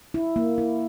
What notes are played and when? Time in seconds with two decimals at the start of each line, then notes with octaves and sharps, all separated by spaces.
0.14 E4
0.36 A#3
0.58 E4